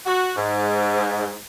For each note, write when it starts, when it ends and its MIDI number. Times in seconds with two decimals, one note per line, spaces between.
0.06 0.32 66
0.36 1.35 44